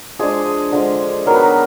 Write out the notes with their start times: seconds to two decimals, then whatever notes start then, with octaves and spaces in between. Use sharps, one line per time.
0.19 F3 G#3 D4 G#4
0.72 D3 F3 G#3
1.26 D#3 F#3 B3 D4 A#4
1.34 B4
1.43 A#4